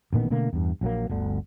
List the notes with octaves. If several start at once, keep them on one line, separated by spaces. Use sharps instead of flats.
A1 A#2 D#3 B3
B2 D3 A3 A#3
E2 G2
A#1 F#3 A#3
G1 D2 D3